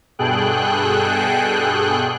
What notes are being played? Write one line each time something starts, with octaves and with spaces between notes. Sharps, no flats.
G2 B2 G#4 A4 G5 F#6